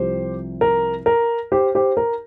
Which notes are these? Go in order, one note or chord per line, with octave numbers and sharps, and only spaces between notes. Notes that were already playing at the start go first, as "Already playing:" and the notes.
Already playing: C2 C3 F3 C4 G4 C5
A#4
A#4
G4 C5
G4 C5
A#4